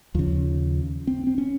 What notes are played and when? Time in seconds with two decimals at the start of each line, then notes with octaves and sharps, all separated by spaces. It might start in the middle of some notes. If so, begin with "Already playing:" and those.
0.15 D#2 C#3 F3
1.07 C4
1.27 C4
1.38 C#4